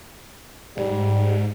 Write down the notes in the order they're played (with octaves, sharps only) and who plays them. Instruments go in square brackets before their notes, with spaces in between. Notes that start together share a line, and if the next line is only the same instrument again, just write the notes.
[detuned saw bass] G#2 [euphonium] G3